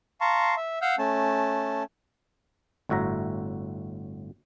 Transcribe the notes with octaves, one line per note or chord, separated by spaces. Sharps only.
F5 A5 A#5 C6 C#6
E5
F5 F#5 E6 F6 G6
A3 C#4 A5
G1 A2 F#4 E5 A#5